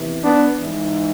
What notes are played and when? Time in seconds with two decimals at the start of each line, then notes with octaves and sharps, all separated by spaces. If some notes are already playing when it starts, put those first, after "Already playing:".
Already playing: E2 C3 E3
0.22 B3 D4
0.60 G#2 E3